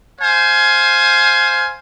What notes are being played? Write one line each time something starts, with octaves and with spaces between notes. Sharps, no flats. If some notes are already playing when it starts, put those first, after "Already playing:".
C5 F5 G#5